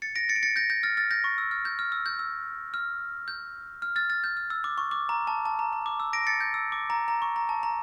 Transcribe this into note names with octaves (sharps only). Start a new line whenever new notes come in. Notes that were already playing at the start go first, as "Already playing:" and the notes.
A6 C#7
A#6 D7
A6 C#7
D7
A6 C#7
G6 A#6
G6 A#6
F6 A6
F6 A6
G6 A#6
C#6
E6
F6
G6
F6
E6
G6
E6
F6
G6
F6
F6 A6
F6 A6
G6
F6
E6
D6
C#6
D6
A#5
A5
A5
A#5
A#5
D6
E6
A#6 D7
A6 C#7
G6
E6
D6
A#5
A#5
C#6
A#5
A5
A#5